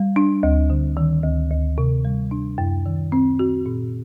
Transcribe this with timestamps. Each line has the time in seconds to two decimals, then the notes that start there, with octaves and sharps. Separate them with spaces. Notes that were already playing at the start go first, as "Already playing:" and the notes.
Already playing: G3
0.16 D4
0.43 D2
0.70 D3
0.97 D#3
1.24 D2
1.51 D2
1.78 C3
2.05 G3
2.31 D4
2.58 F#2
2.86 D#3
3.12 C4
3.39 F#4
3.66 A#2